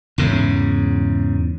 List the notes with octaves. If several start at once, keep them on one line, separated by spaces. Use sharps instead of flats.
E2 G#2 C#3